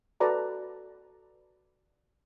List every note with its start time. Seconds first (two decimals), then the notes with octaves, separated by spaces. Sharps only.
0.20 F#4 A4 B4 D5 A#5